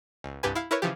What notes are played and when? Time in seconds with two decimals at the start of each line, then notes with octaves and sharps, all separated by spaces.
0.24 C#2
0.43 C2 G2 G4 B4 G#5
0.55 E4 F5
0.71 E4 A#4 B4 C#5
0.82 C#3 E3 F3 G4